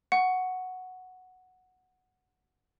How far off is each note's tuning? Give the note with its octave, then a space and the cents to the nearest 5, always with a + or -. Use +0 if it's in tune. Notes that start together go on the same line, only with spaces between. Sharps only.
F#5 +0 C#6 +0